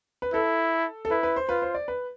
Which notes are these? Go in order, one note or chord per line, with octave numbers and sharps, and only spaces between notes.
B4
E4 A4
A4
E4 B4
B4
C5
F4 B4
C5
D5
B4